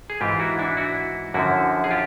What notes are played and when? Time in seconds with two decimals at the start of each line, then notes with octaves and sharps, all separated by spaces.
0.10 G#4
0.21 G#2 E3 F4 G4
0.39 E4 F#4
0.59 D4 E4
0.77 E4 F#4
1.34 F#2 D3 F3 E4 F#4
1.84 G#4
1.91 F4 G4